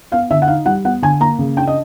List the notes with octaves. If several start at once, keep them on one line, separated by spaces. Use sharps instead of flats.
B3 F5
D3 E5
F#5
D#4 F5
G3 F#5
B3 F#5
D3 G#5
A#3 A#5
C#3
D4 G5
D#5